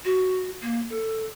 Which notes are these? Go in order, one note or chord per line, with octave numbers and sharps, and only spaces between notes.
F#4
A#3
A4